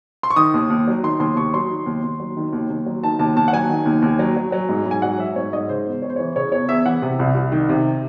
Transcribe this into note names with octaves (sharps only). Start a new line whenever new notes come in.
C6
C#6
D#3 D#6
D#2
D#2
F#3
D#3 C6
D#2 C6
D#2 C#6
F#3 C6
D#3
D#2
D#2
F#3
D#3
D#2
D#2
F#3
D#3 A5
D#2 A5
D#2 A5
F#5
F#3 G#5
D#3
D#2
D#2
F#3
F#3
F#3
G#2
G#2 G#5
F#3 F#5
F#3 E5
G#2 C#5
G#2 D#5
C#3 C5
E2
E2 C#5
C5
E3 C#5
C#3 C#5
E2 C#5
E2 E5
E3 F#5
C3
C2
C2
D#3
C3